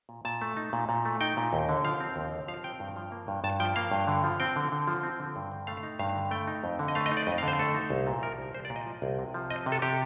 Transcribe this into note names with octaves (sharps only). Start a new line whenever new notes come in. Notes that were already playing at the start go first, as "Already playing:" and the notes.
A#2
A#2 A5
A3
D#4
A#2
A#2
A3
D#4 G5
A#2
D#2
D3
F3 F5
C4
D#2
D3
F3 F5
C4 G5
G2
F3
A#3
G2
G2 A5
F3 G5
A#3 F5
G2
D3
F3
C4 G5
D3
D3
F3
C4
D3
G2
D3
A3 F5
D#4
G2 F5
D3
A3 G5
D#4
F2
D3
D#5
A3 F5
D#5
D#4
D5
F2 D#5
F5
D3
C5
A3 A4
D#4
C2
A#2
F3 A#4
C2
C2 C5
D5
A#2
D#5
F3
C2
C3
F3
C4 D#5
C3
A4
C3 G4